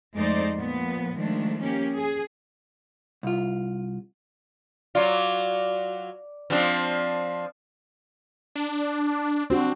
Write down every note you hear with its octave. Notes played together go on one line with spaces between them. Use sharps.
F2 G#3 A3 D#4 C5 D5
A#2 F3 B3
D#3 F3 G#3 A3 D4
A#3 C#4 G4
G#4
C2 F4
F#3 F4 D5
F3 C4 D4
D4
C4 D4 F#4 G4